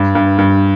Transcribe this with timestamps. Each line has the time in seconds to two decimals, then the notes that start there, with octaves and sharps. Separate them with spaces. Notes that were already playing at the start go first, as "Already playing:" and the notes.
Already playing: G2
0.15 G2
0.38 G2